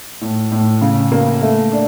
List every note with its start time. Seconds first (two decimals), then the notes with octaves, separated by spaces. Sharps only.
0.21 A2
0.51 A2
0.81 C#3
1.12 A#3
1.42 A3
1.72 D4